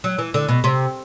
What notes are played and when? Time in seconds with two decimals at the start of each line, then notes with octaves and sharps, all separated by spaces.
0.04 F#3
0.18 E3
0.34 D3
0.49 B2
0.64 C3